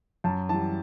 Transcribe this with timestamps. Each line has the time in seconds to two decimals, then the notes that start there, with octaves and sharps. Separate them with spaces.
0.24 F#2 A5
0.49 E3 A5
0.54 G3